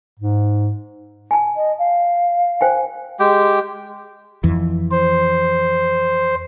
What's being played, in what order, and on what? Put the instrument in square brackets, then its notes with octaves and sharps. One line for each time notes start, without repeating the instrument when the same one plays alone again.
[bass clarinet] G#2
[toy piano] G#5 A5
[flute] D#5
F5
[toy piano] C5 G5 G#5
[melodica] G#3 G4 G5
[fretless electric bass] F2 E3
[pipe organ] C5